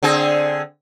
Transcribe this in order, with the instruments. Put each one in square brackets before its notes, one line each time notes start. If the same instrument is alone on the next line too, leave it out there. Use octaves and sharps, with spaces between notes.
[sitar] D3 C4 G#4